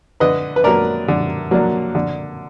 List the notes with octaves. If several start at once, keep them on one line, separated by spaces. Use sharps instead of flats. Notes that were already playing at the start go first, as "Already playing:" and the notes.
D3 B4 D#5
B4
F#3 A#3 D4 A#4 D5
D3
F#3 A#3 D4
D3